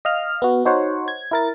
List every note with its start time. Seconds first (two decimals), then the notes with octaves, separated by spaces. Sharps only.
0.05 D#5 F5 F6
0.42 B3 F#4
0.65 D#4 F#4 C5 C#5 F#5
1.08 G#6
1.31 E4 A#4 A6